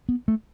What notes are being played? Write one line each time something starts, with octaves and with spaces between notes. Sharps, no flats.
B3
A3